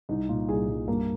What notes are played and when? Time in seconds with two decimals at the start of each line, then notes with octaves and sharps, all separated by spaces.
0.09 C2 D#4
0.29 A#2 F4
0.49 C2 G#4
0.69 C2
0.88 G2 A#3